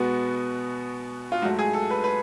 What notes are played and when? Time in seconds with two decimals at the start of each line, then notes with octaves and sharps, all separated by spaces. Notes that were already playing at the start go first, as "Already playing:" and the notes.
Already playing: B2 G#3 B3 F#4
1.32 F4
1.42 G#2 F#3 A3 F#4
1.59 G#4
1.73 A4
1.90 B4
2.04 B4